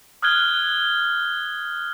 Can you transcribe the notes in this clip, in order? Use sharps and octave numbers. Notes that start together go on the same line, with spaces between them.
D#6 F6 F#6 G#6 G7